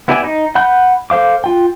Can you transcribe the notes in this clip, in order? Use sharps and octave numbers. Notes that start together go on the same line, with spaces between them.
B3 E4 G4 D5 G#5
D#4
F#5 B5 F#6 G6
A4 C5 F5 D6
F4 G5